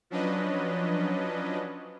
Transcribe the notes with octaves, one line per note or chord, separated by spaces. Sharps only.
F3 F#3 C#4 D4 B4 D#5